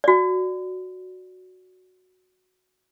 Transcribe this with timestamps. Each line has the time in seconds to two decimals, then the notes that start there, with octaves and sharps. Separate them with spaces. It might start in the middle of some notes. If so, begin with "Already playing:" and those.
0.04 F#4 D5